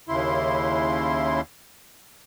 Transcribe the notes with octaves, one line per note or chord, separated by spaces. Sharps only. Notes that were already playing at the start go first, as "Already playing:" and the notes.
D#2 C#3 E4 C6